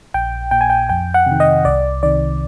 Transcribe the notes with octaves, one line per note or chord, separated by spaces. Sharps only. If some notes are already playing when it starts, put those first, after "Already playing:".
A#1 G5
A#2 G5
G#5
G5
F2 G5
F#5
C3 D#3
D#5
C2 D5
C3 D#3 D5